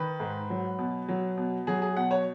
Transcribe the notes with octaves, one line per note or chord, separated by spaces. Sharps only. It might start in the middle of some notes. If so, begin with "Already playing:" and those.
Already playing: D#3 B4
G#2
F#3
B2
F#3
B2
F#3 G#4
G#4
B2 F#5
C#5